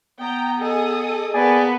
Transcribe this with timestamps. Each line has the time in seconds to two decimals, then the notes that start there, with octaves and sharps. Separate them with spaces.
0.20 B3 G5 A#5
0.59 G#4 A4 D#5 D#6
1.34 A#3 B3 G#4 D5 G#5 A5